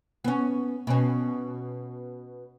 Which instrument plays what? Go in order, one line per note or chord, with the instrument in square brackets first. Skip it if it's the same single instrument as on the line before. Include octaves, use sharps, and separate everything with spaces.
[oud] B3 C#4
B2 C#4